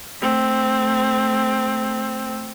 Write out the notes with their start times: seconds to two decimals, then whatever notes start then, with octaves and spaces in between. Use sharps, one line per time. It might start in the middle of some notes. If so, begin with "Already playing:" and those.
0.21 A3 C4